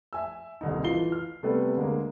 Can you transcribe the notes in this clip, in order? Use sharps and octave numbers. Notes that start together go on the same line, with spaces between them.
E5 G#5 E6
D#1 C2 D#4
E3 F4 C7 G7
F6
C3 G3 A3 B3 A4 B4
D2 G#3 A#3